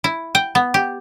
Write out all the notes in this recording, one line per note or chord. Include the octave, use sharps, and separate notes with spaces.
E4
G5
B3
G4